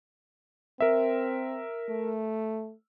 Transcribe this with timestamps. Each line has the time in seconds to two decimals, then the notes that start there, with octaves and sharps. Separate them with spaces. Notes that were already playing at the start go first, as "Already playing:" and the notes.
0.80 C4 A#4 E5
1.90 A3